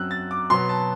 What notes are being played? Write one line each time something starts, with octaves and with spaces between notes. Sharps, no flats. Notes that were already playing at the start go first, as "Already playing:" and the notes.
Already playing: F#2 F#3 C4 E6 F#6
A6
D6
B2 F#3 B3 C6
A5